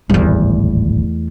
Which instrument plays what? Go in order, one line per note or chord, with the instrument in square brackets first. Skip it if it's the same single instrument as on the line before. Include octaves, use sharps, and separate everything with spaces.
[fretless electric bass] D1 G#1 G3 [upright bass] E2 A3